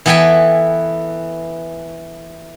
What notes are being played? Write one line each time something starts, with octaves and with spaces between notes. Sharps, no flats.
E3 B3 A4 G5 G#5 B5